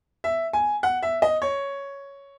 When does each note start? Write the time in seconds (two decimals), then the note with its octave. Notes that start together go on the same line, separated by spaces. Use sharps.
0.24 E5
0.53 G#5
0.83 F#5
1.03 E5
1.22 D#5
1.42 C#5